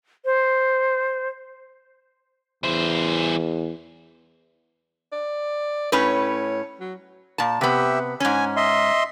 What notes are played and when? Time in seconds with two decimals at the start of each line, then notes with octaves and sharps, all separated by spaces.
0.25 C5
2.64 E2 E3 C5
5.12 D5
5.92 A2 C#4 B4 C#5
6.80 F#3
7.38 A#2 A5
7.61 C3 B3 G4 E5
8.20 G#2 C#4 G#5
8.57 D#5 E5 C6